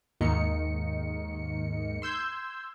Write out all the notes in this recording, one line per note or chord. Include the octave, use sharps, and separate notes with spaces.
D#2 G#2 D#3 A#3 D#4 C#7
C6 E6 G6 G#6